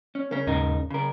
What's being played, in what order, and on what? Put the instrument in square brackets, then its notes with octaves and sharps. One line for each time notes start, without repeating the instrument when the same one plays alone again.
[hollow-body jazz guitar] C#4
[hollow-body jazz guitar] C#3 C#4 [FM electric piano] A#4
[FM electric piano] D#2 G#2 C#4 [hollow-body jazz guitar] C#3 D#4 A#4
[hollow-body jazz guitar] C#3 A#4 [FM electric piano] B5